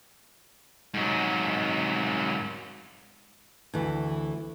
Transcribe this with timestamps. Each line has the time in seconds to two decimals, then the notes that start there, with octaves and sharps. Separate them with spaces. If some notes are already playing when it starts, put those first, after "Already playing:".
0.94 G#2 F#3
3.74 D2 E3